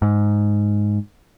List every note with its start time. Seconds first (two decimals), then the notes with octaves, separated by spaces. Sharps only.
0.02 G#2